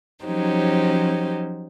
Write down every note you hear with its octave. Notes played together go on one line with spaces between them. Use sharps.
F3 F#3 C#4 D#4 G4 C5